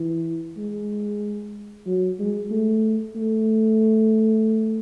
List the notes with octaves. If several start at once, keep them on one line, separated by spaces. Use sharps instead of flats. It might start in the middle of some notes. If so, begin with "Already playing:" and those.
Already playing: E3
G#3
F#3
G#3
A3
A3